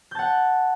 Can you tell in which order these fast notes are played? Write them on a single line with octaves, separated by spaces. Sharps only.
G6 A5 F#5